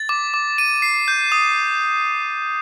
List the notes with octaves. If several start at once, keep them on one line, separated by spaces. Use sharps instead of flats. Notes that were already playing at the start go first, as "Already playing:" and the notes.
Already playing: A6
D6
D6
D#7
C7
G6
D#6